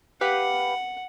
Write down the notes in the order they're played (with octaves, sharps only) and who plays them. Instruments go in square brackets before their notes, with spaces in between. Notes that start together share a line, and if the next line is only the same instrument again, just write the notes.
[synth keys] G4 B4 F5 [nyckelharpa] F#5